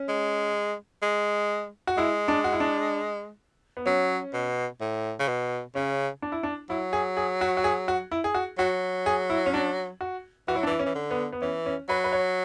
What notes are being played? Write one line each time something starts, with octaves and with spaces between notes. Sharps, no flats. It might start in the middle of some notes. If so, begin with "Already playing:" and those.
Already playing: C#4
G#3
G#3
F#4
G#3 E4
D4
F#4
E4
D4
B3
F#3 C#4
B2
A2
C#3
B2
C#3 C#4
D4
E4
D4
F#3 E4
G#4
G#4
F#4
F#4
G#4
F#4
E4
G#4
F#4
F#3 F#4
G#4
E4
C#4
D4
F#4
E3 F#4
F#3 E4
D4
E3 E4
C#4
E3
D3
B3
B3
E3 C#4
C#4
F#3 B4
B4
C#5